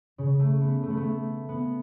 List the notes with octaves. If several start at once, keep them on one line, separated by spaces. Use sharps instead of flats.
C#3
A3
B3
A3
B3
A3
B3